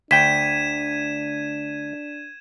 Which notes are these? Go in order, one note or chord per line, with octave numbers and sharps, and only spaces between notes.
D2 D4 G5 G#6 B6 D#7 E7